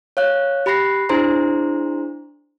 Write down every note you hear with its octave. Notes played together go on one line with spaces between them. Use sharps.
C#5 F5 F#6
G4 B5 F#6 A#6 C7
D4 E4 G#4 C5 A#5 C6